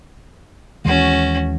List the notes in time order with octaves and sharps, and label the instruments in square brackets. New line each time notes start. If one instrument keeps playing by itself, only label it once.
[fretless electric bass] D#2 E3 G#3 [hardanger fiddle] C#4 F#4